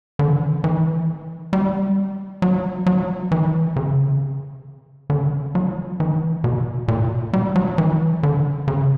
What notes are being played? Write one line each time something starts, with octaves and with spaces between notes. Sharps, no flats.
D3
E3
D3
E3
G3
F#3
F#3
E3
C#3
D3
F#3
E3
B2
A#2
B2
A#2
G3
F#3
E3
D3
C#3